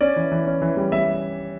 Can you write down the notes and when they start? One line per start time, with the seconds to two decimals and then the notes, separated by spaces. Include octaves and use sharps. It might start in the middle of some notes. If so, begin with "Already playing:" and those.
0.01 C#4 D5
0.16 E3
0.31 E3
0.46 C#4
0.62 E3
0.77 G3
0.92 G3 E5